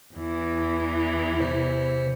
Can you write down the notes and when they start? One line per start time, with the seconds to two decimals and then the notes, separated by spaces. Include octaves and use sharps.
0.16 E2 E3
1.40 C3 C5